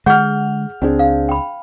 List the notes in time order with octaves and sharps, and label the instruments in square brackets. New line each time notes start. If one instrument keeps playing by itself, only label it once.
[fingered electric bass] D3 G#3 [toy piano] G#4 F#5 [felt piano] F6 G6
[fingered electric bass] C#2 [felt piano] C4 D4 G#4
[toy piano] F5
G5 B5